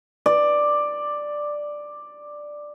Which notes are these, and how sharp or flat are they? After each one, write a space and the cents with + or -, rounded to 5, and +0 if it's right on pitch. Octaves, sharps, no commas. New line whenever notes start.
D5 +5